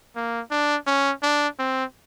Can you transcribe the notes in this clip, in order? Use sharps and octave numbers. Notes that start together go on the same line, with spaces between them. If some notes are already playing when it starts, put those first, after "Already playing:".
A#3
D4
C#4
D4
C4